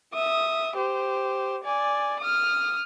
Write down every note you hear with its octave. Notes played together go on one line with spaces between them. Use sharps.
E5 D#6
G4 C5
D5 G#5
D#6 F6